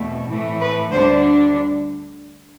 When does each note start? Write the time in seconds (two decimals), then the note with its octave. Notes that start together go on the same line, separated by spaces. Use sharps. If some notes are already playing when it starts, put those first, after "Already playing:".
Already playing: E2 B2 A3 C4
0.29 A2 E3 A3
0.61 B4
0.92 D2 D3 G3 D4 C5